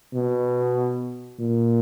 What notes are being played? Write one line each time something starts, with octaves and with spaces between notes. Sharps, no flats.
B2
A#2